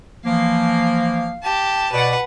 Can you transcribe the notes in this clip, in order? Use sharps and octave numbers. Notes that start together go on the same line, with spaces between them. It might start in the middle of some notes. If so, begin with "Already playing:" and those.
E3 F3 A#3 F5
G4 A5
B2 B4 D5 F#5